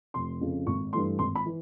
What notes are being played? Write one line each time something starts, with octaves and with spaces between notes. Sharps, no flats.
F1 C6
F2 C#3
G#1 C#6
G2 E3 A3 C6
G#1 C6
B5
E3